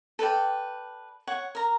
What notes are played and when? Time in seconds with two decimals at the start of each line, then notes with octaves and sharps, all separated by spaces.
0.19 A4 B4 D5 G5
1.27 C#5 F#5 C#6
1.55 A#4 A#5